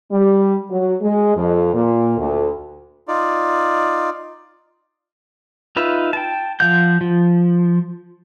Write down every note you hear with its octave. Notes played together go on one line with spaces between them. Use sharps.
G3
F#3
G#3
F2
A#2
D2
D#4 F4 D5
D#4 F4 B4 E5
G5 A5
F3 F5 F#5 G6
F3